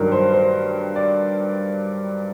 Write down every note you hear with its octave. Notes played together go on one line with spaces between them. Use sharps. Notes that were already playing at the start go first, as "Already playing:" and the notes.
Already playing: G2 D#3 F#3 A#4
C5
C5
D5